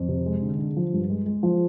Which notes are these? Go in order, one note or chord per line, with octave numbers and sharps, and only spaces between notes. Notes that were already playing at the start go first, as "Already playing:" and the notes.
Already playing: F2
C3
G#3
D3
D3
F3
G2
G#3
G#3
F3